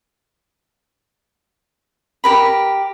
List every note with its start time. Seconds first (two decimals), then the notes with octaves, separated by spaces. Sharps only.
2.24 G4 A#4 B5